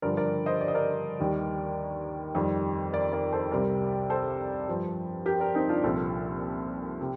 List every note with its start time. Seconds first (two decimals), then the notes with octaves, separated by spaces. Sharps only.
0.02 G2 D3 F3 A#4 D5
0.17 A#4 D5
0.46 C5 D#5
0.61 D5
0.68 D#5
0.75 A#4 D5
1.19 D#2 D#3 G3
2.35 F2 D#3 G3
2.93 A#4 D5
3.13 A#4 D5
3.32 A4 C5
3.51 C2 C3 G3 A#4 D5
4.10 A4 C5
4.68 G2 F3
5.26 G4 A#4
5.40 A#4 D5
5.55 C4 D#4
5.69 D4 F4
5.83 C2 A#2 F3 F4 A4
7.01 C3